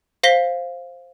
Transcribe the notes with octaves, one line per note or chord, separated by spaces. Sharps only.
C5 F5 A#6 B6 G7